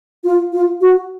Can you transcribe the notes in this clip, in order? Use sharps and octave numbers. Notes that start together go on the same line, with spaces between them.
F4
F4
F#4